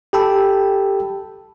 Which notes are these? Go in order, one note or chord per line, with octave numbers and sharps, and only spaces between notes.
G4 A4 G5 A5 B5 E6